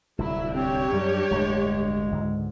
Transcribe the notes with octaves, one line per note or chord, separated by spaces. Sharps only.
D1 C2 F#3 E4
C4 D4 G4 C#5
F#2 G3
D1 G2 G#3 A3
C#2 G#2 D3